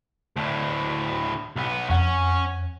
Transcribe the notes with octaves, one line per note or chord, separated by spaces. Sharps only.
D2 A2
B1 B3
F2 C#4 F#5